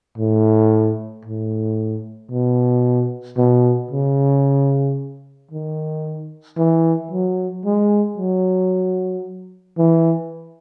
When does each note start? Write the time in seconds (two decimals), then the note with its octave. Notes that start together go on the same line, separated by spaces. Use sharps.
0.18 A2
1.25 A2
2.31 B2
3.37 B2
3.91 C#3
5.51 D#3
6.58 E3
7.11 F#3
7.65 G#3
8.18 F#3
9.78 E3